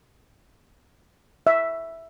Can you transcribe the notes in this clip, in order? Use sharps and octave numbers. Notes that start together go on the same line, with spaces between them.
E5